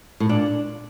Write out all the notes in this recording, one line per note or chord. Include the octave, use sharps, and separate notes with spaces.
A2
A#2 D4